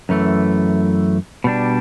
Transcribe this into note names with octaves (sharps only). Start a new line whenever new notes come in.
F#2 E3 A3
B2 G3 D4